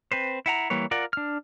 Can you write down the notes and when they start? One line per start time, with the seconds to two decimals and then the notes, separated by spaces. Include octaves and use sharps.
0.12 C4 B4 C5
0.46 E4 F#5 A#5
0.70 E3 G3 A#3 B4 C#5
0.91 F4 A#4 D5 F#5
1.13 D4 F6